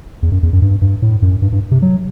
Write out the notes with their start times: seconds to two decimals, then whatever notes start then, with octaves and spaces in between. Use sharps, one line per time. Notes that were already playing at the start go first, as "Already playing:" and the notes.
0.23 E2
0.32 F#2
0.43 E2
0.53 F#2
0.62 G2
0.82 G2
1.02 A2
1.22 F#2
1.42 G2
1.52 G2
1.71 C3
1.82 F#3